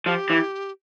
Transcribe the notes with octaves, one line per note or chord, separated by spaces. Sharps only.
F3 G4
E3